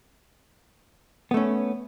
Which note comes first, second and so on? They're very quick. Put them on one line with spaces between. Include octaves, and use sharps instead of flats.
B3 A3 C#4